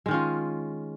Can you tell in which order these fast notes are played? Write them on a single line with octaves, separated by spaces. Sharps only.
G#3 D#3 C#4 F4